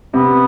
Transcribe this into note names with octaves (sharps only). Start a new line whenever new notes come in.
C3 B3